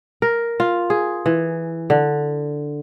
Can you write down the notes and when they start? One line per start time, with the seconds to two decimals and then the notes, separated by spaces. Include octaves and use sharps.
0.22 A#4
0.60 F4
0.90 G#4
1.26 E3
1.90 D3